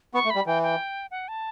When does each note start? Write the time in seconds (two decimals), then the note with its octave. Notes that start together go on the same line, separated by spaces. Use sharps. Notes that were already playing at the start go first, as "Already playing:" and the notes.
0.14 B3 C#6
0.25 A3
0.30 B5
0.35 G3
0.46 E3 G5
0.63 G5
1.11 F#5
1.28 A5